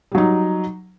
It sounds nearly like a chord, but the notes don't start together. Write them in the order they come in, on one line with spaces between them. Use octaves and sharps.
G3 F#3 D#4